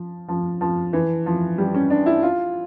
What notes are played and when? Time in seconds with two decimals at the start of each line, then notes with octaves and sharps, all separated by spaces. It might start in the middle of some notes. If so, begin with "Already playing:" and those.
Already playing: F3
0.28 F3
0.61 F3
0.93 E3
1.26 F3
1.58 G3
1.74 C#4
1.90 D4
2.06 E4
2.23 F4